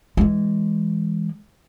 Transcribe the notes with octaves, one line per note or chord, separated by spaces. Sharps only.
E3 G#3